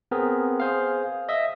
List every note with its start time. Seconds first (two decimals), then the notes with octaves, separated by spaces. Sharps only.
0.11 B3 C4 G#4 A#4
0.60 G#4 C5 F5
1.29 D#5 E5